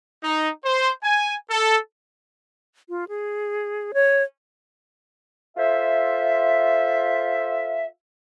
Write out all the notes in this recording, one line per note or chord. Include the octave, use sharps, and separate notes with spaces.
D#4
C5
G#5
A4
F4
G#4
C#5
F4 A4 C5 E5